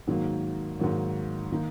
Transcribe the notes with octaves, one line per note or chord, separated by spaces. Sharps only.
G#2 D#3 F#3 A#3
G#2 D#3 F#3 A#3
D#3 A#3 D#4